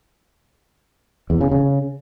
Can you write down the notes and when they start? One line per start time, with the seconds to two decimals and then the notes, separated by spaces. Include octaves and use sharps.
1.30 E2
1.41 C#3
1.51 C#3